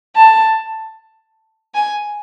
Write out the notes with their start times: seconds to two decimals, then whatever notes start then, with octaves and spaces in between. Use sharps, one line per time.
0.16 A5
1.74 G#5